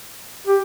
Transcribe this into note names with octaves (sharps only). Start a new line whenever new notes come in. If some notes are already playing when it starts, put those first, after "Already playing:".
G4